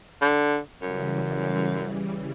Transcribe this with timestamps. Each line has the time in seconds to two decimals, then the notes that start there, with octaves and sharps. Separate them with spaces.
0.22 D3
0.82 F#2 C#3 E3 G3